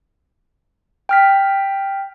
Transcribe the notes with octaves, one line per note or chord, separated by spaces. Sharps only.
G5 F6 B6